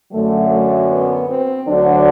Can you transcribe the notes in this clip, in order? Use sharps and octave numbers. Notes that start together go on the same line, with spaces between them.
F#2 D3 F#3 A3
A3
B3
C4
D2 D3 F#3 D4